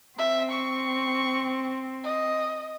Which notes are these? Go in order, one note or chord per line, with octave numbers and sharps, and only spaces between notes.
C4 E5
C#6
D#5